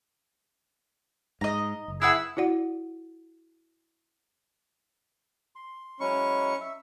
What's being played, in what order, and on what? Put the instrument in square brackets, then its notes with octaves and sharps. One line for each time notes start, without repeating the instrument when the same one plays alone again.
[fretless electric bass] G#2 [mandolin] D#5 A#5
[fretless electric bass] F#1
[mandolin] E4 B4 F#5 [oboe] G#4 [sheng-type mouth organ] E6
[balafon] E4 F#4 D5 F#5
[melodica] C6
[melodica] F#3 G#3 E4 [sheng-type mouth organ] C#4 C#6
[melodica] E5